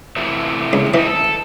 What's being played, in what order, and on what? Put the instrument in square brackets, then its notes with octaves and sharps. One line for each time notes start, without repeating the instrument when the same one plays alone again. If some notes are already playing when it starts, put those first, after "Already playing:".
[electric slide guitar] C3 E3 A3
[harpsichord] C#2
[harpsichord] E3 [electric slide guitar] C4 D#4
[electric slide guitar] A4